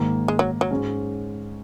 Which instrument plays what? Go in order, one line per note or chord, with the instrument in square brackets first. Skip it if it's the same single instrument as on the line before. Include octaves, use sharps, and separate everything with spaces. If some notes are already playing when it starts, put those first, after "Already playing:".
Already playing: [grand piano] G#2 D#3 A#3
[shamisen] G#3
F#3
F#3
[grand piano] G#2 G#3 C#4